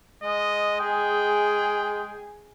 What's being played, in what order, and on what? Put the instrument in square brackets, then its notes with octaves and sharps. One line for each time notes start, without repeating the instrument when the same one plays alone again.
[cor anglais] G#3 [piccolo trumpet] D#5
[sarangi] G#4 [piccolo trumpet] G5